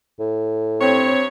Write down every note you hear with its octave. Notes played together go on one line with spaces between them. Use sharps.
A2
G2 C4 C#5